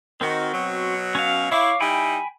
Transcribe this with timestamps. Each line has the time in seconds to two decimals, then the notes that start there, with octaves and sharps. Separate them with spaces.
0.21 D#3 C4 F#4
0.54 B2 F#3
1.15 C#4 F5
1.52 E4 C#5 F5 D6
1.80 G3 D#4 E4 G5 G#5 B5